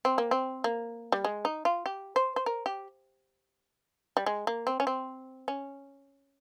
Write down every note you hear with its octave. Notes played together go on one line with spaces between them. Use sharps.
C4
A#3
C4
A#3
G3
G#3
D#4
F4
G4
C5
C5
A#4
G4
G3
G#3
A#3
C4
C#4
C4
C#4